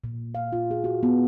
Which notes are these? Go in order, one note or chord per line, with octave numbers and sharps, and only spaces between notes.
A#2
F5
F4
G#4
F#4
B3